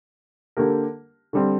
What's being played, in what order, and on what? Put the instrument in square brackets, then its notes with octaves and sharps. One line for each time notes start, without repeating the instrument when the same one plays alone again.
[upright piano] D3 A#3 G4 A#4
D3 G3 C4